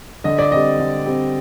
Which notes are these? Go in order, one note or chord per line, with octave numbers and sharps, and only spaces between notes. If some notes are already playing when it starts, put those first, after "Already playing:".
D3 D#5
D5
G3 C4 D#5
D3
G3 C4